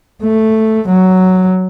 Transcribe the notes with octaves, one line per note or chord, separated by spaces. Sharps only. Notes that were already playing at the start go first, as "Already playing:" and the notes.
A3
F#3